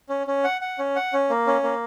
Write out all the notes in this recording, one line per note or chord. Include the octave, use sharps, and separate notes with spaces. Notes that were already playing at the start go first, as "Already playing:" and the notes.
C#4
C#4
F#5
F#5
C#4
F#5
C#4
A#3
C#4
A#3